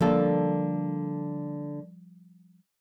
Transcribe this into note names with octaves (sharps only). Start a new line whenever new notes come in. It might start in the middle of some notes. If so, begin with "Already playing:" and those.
D3 F3 G3 A#3 A4